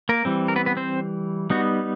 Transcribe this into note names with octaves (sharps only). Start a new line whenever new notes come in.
A#3 A#4
E3 G3 C4
A#4
B3 B4
B3 B4
C4 C5
G3 B3 D#4 F#4